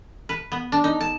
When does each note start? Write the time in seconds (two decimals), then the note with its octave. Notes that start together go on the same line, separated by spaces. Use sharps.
0.29 B4
0.52 B3
0.72 D4
0.84 D#4
1.01 A5